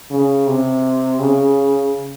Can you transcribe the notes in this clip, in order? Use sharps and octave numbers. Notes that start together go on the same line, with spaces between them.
C#3
C3
C#3